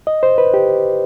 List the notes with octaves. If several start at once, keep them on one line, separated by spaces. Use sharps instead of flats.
D#5
C5
B4
G4